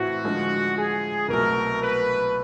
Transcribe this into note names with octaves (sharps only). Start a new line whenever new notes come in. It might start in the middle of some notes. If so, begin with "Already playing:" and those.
Already playing: A2 E3 A3 C4 E4 F#4
D3 F3 G#3
G#4
C2 B2 F#3 A3 A#4
B4